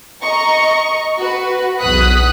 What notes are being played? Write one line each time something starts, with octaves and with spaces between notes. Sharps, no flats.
D#5 A#5 C#6
F#4 B4
B1 E2 F#5 D#6 F#6 B6